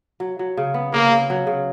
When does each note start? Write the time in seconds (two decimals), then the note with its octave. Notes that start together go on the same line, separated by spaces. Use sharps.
0.20 F#3
0.39 F#3
0.57 C#3
0.74 B3
0.93 C#3 A#3
1.12 C#3
1.30 F#3
1.47 C#3